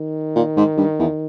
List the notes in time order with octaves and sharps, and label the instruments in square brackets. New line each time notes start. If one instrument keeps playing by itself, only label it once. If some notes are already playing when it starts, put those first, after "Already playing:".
Already playing: [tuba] D#3
[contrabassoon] A#2
G#2
G2
E2